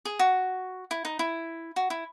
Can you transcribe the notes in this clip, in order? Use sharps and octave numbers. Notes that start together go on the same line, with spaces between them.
G#4
F#4
E4
D#4
E4
F#4
E4